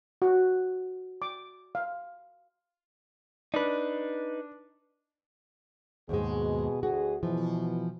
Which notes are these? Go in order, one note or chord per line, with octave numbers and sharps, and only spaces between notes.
F#4
D6
F5
D4 D#4 B4
D#2 G#2 B2 G#3 G#4
D2 F#4 G#4
B2 E3 F3 E4